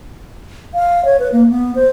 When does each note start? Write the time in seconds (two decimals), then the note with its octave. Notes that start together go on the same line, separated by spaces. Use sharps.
0.74 F5
1.05 C#5
1.19 B4
1.32 A#3
1.50 B3
1.75 C5